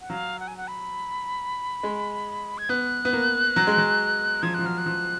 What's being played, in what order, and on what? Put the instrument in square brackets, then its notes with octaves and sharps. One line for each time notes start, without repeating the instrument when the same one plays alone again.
[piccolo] F#5
[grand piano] F#3 [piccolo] F5
[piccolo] F#5
G#5
F#5
B5
[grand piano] G#3
[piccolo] G#6
[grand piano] B3 [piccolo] F#6
[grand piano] B3
A#3
F#3
G#3
F#3
[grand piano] F3 [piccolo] G#6
[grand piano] F3 [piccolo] F#6
[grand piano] F#3 [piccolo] F6
[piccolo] F#6
[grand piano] F3